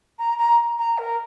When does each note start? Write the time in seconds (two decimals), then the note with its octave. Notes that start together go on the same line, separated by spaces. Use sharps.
0.18 A#5
0.38 A#5
0.78 A#5
0.98 A#4